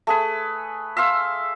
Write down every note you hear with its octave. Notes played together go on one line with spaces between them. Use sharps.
A3 G#4 B4
E5 F5 C6 E6